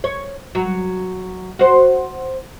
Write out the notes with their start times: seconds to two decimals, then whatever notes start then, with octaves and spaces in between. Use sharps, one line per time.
0.04 C#5
0.55 F#3
1.59 F#4 C5